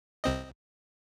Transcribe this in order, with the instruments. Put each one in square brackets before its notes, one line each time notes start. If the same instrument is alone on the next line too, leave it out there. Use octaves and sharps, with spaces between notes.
[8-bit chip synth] C2 C4 D#5